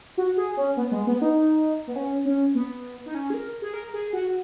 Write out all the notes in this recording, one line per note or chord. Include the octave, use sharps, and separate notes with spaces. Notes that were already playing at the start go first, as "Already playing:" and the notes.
F#4
G#4
C#4
B3
G#3
B3
D#4
B3
C#4
C#4
B3
D#4
C#4
G#4
A#4
G#4
A#4
G#4
F#4